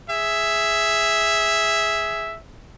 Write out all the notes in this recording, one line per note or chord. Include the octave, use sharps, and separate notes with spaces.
G#4 E5